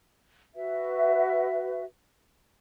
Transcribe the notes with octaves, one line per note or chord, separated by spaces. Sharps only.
F#4 B4 E5